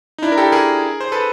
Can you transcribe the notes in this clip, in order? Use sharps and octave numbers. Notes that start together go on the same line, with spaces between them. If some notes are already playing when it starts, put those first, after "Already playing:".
D#4
D4 E4
A#4
G4 A4
G#4 A#4
C5
A4 B4